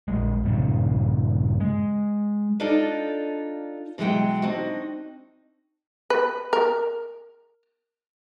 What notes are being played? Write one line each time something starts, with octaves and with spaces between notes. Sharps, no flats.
A#1 G#3
G2 A#2 C#3
G#3
D4 D#4 F4 A4 D5 D#5
B2 E3 F#3 G#3 F#5 G5
C4 D4 D#4 F#4
B4
A#4